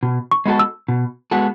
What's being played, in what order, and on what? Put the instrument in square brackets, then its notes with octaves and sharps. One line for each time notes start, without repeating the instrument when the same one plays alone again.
[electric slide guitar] B2
[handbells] C#6
[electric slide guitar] G#3 B3 F#4 A4
[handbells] E6
[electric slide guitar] B2
G#3 B3 F#4 A4